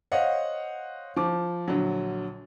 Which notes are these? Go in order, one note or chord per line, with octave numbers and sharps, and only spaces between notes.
C5 C#5 D#5 F5 F#5
F3 D6
A#1 D3 F#3